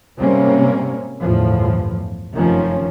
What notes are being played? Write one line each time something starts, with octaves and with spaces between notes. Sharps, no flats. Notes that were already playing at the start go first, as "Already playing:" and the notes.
G#2 C3 G3 A#3 C4 C#4
G1 E2 A2 F3
F1 F#2 D#3 F3 C#4